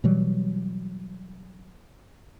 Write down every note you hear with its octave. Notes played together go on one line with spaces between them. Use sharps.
B2 E3 F#3 G3